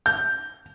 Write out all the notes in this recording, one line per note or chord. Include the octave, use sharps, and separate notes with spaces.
G6